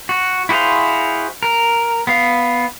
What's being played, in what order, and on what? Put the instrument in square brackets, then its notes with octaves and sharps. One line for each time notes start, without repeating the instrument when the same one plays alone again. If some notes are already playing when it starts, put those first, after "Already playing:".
[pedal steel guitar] F#4
E4 F#4 G#4 C5 F5
A#4
B3 F5